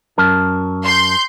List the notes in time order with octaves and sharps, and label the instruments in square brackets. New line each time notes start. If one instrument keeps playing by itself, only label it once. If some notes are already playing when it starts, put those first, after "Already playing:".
[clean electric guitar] F#2 A#4 A5
[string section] C6 G6